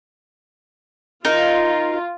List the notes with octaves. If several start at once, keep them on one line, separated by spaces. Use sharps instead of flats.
D#4 F4 A#4